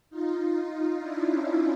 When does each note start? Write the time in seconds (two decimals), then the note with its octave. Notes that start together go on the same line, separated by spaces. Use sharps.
0.10 D#4 F4
0.54 D#4 F4
0.99 D4 E4
1.29 C#4 D#4